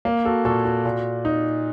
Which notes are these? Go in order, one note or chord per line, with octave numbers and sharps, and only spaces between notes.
A#3
F#4 A4
A#2 F#4 A4
F#4
A#2
D#4